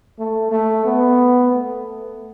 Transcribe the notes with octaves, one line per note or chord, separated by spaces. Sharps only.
A3
A3
B3
A3